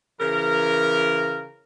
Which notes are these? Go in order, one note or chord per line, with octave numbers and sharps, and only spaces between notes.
C#3 E3 A#4